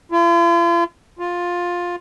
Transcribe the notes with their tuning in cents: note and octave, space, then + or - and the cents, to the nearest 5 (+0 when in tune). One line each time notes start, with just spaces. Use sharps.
F4 -45
F4 +10